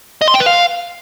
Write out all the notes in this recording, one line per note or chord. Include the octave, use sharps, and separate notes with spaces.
D#5
C6
G5
B4
F5